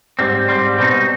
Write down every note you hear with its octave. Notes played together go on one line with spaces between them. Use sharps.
G#2 G3 C4
G#2 G3 C4
B2 G3 C4 D#4